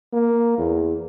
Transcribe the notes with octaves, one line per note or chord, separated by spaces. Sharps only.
A#3
E2